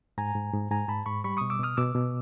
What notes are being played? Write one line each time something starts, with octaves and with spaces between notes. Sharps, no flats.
G#2 G#5 A#5
G#2
G#2
G#2 G#5 A#5
G#2 A5 B5
G#2 B5 C#6
G3 B5 C#6
B2 C#6 D#6
D6 E6
B2 D#6 F6
B2 D6 E6
B2